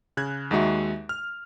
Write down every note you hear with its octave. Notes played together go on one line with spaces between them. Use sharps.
C#3 F#6 G#6
D#2 G#3 D#4 F#4 E5
F6